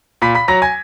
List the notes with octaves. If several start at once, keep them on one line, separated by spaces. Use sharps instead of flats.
A#2 B5 B6
B5 B6
F#3 A#5 A#6
G#5 G#6